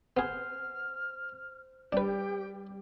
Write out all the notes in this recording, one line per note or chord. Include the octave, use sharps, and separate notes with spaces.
B3 G#4 C5 F6
G3 D4 G4 B4 G5